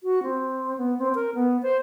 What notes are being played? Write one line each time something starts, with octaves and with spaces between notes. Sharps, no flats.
F#4
C4
B3
C4
A#4
B3
C5